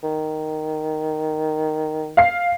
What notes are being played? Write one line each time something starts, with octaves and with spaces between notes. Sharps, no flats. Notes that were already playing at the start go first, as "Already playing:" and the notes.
D#3
F5 C7